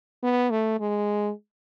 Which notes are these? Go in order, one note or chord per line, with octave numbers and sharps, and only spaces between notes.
B3
A3
G#3